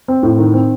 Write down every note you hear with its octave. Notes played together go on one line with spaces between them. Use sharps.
C4
A2
D#3
C4